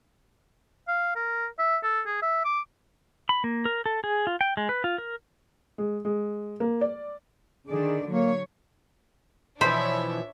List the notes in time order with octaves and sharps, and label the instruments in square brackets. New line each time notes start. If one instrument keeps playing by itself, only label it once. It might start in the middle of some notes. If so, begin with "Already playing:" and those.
[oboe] F5
A#4
E5
A4
G#4
E5
D6
[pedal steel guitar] B5
A#3
A#4
A4
G#4
F4
G5
G#3
B4
F4
A#4
[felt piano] G#3
G#3
A#3
D5
[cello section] D3 D#3 D5 [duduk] G#4
[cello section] F#3 C#5 [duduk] A#3
[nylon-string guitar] B2 E3 F3 [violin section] D4 C#5 E5 [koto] C5 [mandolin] B5